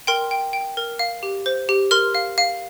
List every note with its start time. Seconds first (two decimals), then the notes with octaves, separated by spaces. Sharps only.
0.07 A#4 G5 C6
0.31 G5
0.53 G5
0.77 A#4
0.99 F5
1.23 G4
1.46 C5
1.69 G4
1.91 A#4 C6 F6
2.15 F5
2.38 F5